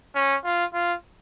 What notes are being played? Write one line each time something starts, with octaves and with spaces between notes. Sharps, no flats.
C#4
F4
F4